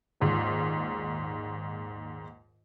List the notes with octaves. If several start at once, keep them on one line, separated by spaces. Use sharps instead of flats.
A#1 D#2 G#2